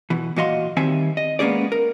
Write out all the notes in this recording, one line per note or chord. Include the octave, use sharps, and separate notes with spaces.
B2 E3
A#2 E3 F#4 D#5 F5 C6
D#3 G3 C4 E5 G#5
D#5
G#3 A#3 B3 C#4 G#4 D5
A#4